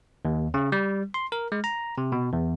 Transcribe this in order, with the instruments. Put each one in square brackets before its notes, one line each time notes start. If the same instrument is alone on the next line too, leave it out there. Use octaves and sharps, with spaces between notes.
[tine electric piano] D#2
C#3
G3
C6
A#4
G#3
A#5
C3
B2
E2